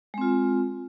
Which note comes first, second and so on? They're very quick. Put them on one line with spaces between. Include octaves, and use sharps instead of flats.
G#3 C4 F4